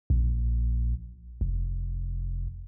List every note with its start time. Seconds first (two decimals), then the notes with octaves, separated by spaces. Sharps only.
0.10 A#1
1.41 F1